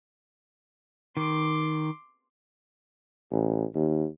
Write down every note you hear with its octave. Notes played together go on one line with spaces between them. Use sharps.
D#3 C6 D6
A1
D#2